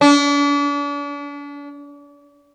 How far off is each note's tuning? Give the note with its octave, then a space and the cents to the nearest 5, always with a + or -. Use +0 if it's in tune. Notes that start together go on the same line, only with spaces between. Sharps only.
D4 -40